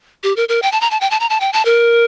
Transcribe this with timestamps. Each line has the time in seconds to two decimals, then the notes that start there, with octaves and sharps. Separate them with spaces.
0.24 G4
0.36 A#4
0.49 A#4
0.62 G5
0.72 A5
0.81 A#5
0.91 A5
1.01 G5
1.11 A5
1.20 A#5
1.30 A5
1.40 G5
1.53 A5
1.65 A#4